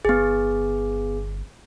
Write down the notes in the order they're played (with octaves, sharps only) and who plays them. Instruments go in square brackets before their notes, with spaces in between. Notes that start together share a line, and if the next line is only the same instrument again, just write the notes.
[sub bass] G1 [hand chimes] B3 G#4